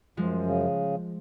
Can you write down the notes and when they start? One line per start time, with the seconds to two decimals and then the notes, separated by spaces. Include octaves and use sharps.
0.17 F#2 F3 G#3
0.46 C#3